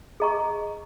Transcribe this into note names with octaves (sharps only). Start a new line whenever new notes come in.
G#4 D#5 A#5 C#6